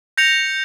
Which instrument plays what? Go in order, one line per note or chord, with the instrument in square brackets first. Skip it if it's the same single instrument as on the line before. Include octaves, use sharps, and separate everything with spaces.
[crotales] G6 A#6 C#7 F7